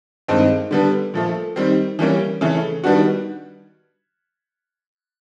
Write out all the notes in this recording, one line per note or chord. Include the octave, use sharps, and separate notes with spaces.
G2 D#3 G#3 C4 D#4
D3 G3 B3 D4
A#2 F3 A3
D#3 G3 C4
E3 G3 A#3 C#4
C#3 E3 A3
D#3 G3 B3 D4 F#4